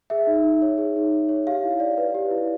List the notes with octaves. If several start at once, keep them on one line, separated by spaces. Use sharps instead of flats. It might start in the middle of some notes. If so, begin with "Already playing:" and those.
G#4 E5
D#4
D#4
C#5
G#4
D#4
D#4
C#5
G4 F5
E4
D5
B4
G4
E4